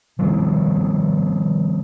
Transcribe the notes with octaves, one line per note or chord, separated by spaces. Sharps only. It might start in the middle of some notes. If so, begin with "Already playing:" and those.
D#3 F3 G3 B3